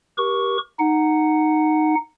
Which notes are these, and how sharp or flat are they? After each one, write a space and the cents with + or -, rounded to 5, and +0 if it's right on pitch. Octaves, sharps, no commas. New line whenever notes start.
G4 +0 A#4 +35 C#6 +5
D#4 -10 F#5 +0